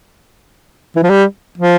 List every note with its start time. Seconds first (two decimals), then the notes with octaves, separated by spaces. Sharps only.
0.96 E3
1.03 F3
1.10 G3
1.58 F3